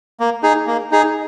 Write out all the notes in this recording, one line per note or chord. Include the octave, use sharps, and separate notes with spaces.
A#3
D#4 G#4
A#3
D#4 G#4